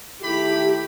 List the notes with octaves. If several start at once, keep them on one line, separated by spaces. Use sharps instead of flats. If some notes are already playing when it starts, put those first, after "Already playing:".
D#3 A3 E4 G4 B5